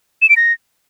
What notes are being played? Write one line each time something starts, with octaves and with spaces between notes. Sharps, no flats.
E7
D7
A#6